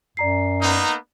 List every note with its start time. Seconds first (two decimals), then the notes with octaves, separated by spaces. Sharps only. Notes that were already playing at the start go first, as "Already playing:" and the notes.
0.17 F#2 D5 A#5 C7
0.61 A#3 B3 D#4